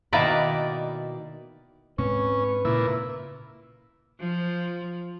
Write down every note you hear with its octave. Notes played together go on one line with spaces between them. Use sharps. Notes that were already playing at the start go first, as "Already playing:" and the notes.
B2 D#3 A#3 E4 B4 D5
G#2 G#3 C4 C#4 B4
A#2 C#3 E4
F3